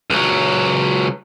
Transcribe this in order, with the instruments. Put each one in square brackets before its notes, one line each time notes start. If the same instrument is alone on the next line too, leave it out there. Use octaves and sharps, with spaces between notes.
[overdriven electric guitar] C#2 F#3